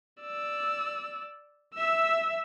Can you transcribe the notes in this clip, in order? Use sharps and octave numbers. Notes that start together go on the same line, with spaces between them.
D5 E6
E5 E6